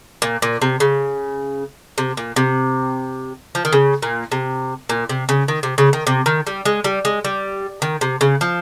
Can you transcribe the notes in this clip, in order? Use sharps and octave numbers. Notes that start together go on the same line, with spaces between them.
A#2
A#2
C3
C#3
C3
A#2
C3
F3
D#3
C#3
A#2
C3
A#2
C3
C#3
D#3
C3
C#3
D#3
C3
D#3
G3
G#3
G3
G#3
G3
D#3
C3
C#3
F3